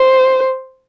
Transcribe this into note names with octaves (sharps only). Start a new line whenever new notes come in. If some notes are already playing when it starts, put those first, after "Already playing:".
Already playing: C5